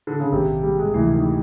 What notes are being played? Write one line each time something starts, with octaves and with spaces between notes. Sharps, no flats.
D3
C#3
A#1 G#2 C3 D#3
G3
G#3
D2 C3 E3 F3 A3
D#3